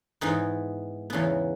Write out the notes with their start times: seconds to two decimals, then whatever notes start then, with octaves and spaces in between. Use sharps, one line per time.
0.21 G#2 E3 B3 D#4
1.10 E2 C#3 E3 B3